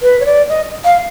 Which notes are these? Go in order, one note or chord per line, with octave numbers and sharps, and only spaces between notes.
B4
C#5
D5
D#5
F5